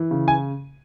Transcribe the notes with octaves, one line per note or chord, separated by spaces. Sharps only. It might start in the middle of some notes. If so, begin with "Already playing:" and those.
Already playing: E3
C#3
G#5